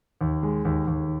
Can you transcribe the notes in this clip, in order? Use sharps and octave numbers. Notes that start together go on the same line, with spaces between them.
D#2
G#3
D#2
D#2